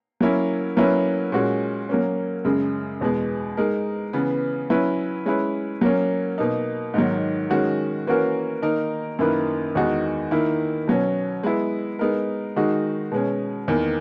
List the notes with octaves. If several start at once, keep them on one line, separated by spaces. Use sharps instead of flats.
F#3 A#3 C#4 E4
F#3 A#3 C#4 E4 B4
A#2 G#3 C#4 F#4
F#3 A#3 C#4
F#2 C#3 G#3
E2 B2 G#3
G#3 D#4 A#4
C#3 E3 B3
F#3 C#4 E4 B4
G#3 C#4 E4 B4
F#3 A#3 C#4
B2 A#3 D#4
G#2 D#3 F#3
D#3 G#3 C#4 F#4
E3 A#3 C#4 F#4 A#4
D#3 A#3 D#4 A#4
F#2 D#3 A#3 E4 B4
E2 D#3 G#3 D#4 F#4
D#3 A#3 E4
B2 F#3 C#4
G#3 B3 E4
G#3 B3 D#4 A#4
D#3 G#3 D#4 F#4
B2 G#3 C#4
E2 D#3 A#3